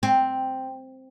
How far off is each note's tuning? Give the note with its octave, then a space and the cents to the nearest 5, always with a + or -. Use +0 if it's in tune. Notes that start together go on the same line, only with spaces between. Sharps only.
C4 +0